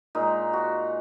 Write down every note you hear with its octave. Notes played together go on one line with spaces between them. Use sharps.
A#2 G#3 D#4
F#4